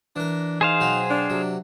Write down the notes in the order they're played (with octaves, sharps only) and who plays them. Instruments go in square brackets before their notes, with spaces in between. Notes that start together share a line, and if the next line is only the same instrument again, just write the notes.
[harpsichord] E3 A#4 [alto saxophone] D4
[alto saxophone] D#4 [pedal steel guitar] G#4 C5 F5
[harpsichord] B2 F#3 C4
[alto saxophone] D4
[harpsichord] C3 F#3